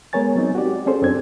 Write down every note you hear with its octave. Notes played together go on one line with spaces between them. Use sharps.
G#3 B3 A#4 C#5 G#5 A6
F#3 C4 D#4
F#4 G4 D5
C4 C#4 G#4 A4 C5
F#2 C4 D4 G#6